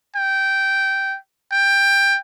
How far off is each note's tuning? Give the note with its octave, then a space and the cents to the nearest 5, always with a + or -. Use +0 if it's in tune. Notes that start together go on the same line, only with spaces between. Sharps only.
G5 -10
G5 +15